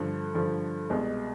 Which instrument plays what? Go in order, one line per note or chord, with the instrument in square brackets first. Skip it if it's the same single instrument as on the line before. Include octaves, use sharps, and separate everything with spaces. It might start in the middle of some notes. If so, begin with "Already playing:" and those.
Already playing: [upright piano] G2 D3 F3
G2 D3 F3
C2 B2 G#3